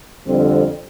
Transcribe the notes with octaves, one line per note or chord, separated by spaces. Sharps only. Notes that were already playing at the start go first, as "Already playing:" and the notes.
F2 D3 G3 C4